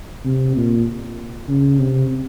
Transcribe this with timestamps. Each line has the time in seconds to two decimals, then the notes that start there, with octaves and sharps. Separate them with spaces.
0.25 C3
0.56 A#2
1.48 C#3
1.79 C3